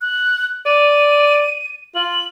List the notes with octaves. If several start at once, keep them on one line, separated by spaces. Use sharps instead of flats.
F#6
D5 D#7
F4 F#7